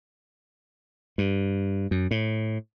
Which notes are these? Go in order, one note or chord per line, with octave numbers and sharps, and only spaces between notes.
G2
F#2
A2